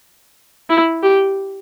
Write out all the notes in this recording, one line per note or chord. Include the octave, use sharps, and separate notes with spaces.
E4
G4